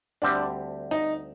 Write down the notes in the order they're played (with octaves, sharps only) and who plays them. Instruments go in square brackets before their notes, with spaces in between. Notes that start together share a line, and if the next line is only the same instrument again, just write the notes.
[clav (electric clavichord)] D2 D3 G3 C4 G4 [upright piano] D4
[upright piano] D#4